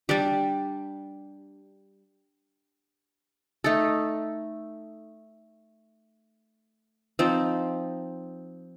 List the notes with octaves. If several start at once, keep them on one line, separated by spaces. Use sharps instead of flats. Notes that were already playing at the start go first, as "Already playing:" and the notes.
G3 D4 G4
A3 D#4 A4
F3 C4 D#4